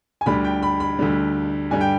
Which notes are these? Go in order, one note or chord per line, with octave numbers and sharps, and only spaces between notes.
G#5
D2 D3 G3 B5
G5
B5
B5
D2 D3 G3
G2 D3 G3 G#5
G5